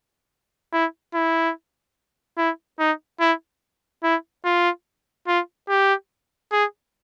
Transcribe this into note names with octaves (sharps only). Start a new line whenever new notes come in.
E4
E4
E4
D#4
E4
E4
F4
F4
G4
G#4